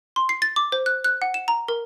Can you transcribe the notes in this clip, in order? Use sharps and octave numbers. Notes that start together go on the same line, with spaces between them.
C6
C7
A6
D6
C5
F#6
F#6
F#5
E7
A#5
A#4